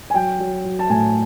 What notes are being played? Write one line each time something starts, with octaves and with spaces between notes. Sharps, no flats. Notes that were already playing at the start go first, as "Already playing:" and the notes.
G#5
F#3 G5
F#3
F#3
A5
A2 G#5